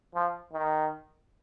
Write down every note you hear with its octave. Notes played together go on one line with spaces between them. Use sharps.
F3
D#3